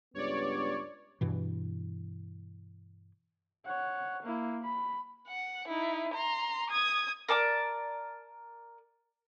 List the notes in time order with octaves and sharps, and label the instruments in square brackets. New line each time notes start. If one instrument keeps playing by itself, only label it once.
[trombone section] C#2 G2 B3 [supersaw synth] C#5 D5
[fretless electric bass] G2 B2 E3
[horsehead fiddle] C#5 F#5
A#3 E4
B5
[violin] F#5
D#4 E4
A#5 C6
D#6 G#6
[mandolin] A#4 D5 A5 D6